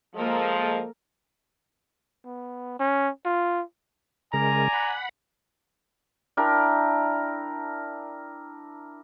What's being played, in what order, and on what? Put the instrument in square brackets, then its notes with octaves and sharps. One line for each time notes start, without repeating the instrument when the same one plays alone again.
[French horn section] F3 G#3 [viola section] A#3 A4 A#4
[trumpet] B3
C#4
F4
[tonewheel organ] C#3 G#3 A#4 [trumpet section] D5 G#5 [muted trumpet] A#5
[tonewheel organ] F#5 B5
[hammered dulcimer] D4 E4 A#4 G5